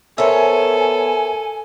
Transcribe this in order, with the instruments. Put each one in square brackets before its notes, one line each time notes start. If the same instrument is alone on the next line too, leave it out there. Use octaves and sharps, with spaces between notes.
[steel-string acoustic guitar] B3 C#5 [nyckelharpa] A4 [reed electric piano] A#4 C5 E5 [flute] G#5